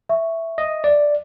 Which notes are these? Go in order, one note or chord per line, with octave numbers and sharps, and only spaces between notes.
E5 C#6
D#5
D5